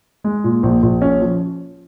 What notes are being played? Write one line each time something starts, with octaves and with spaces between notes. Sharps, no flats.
G#3
A#2
A#1
A#1
C#4
F3